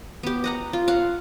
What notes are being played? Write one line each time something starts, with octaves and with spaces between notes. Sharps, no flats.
B3 G4
D#5 F#5 A#5
F4
F5 F#5